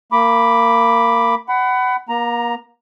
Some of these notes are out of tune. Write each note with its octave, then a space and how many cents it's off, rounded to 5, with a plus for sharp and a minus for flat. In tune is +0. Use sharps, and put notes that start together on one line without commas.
A#3 -20 B5 +0 D6 +5
F#5 +25 B5 +20
A#3 +35 A#5 +5